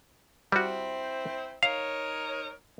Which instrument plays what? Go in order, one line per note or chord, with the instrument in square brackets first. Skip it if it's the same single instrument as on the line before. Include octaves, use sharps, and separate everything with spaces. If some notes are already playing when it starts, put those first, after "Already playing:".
[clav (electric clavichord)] G3 F#4 [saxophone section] C4 E4 C5
[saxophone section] D#4 A#4 C#5 [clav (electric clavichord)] F5